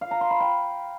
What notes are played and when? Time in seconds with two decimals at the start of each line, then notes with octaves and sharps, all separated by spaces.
0.01 F5
0.11 A#5
0.21 C6
0.31 B5
0.40 G5